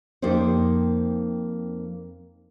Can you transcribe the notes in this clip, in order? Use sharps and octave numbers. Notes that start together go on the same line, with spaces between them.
F2 A#3 D#4 G4 C5